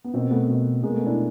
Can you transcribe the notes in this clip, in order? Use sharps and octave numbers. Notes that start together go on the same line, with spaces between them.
B3
B2 A#3 C4
A3 B3
B2
B2 G#3 A#3
A3 B3
D4 E4